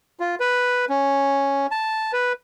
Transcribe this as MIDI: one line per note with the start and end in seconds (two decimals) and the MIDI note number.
0.20 0.35 65
0.40 0.85 71
0.89 1.67 61
1.71 2.12 81
2.13 2.33 71